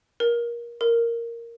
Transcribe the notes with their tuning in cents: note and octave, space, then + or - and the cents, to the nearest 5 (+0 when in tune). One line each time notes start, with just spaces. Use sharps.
A#4 +20
A#4 -5